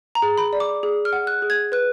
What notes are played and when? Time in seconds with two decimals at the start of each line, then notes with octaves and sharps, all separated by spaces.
0.15 A#5
0.22 G#4
0.38 B5
0.53 D5
0.60 D6
0.83 G#4
1.05 F6
1.13 F#5
1.27 F#6
1.42 G#4
1.50 G#6
1.72 B4 F#6